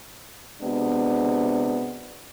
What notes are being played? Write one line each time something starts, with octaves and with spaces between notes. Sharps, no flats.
C3 G#3 B3 D4 F#4